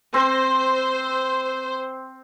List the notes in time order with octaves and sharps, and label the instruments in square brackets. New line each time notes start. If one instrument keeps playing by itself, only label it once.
[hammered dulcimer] C4 [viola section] C5